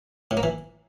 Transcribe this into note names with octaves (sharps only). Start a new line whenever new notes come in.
A2
A#3
E3